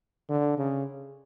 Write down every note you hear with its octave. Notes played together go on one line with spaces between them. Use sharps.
D3
C#3